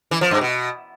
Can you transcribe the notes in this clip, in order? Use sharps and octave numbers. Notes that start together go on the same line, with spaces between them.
E3
F3
G2
B2